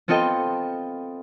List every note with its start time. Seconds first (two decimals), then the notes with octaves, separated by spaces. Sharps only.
0.08 B3 C4 F4 A4 D#5 G5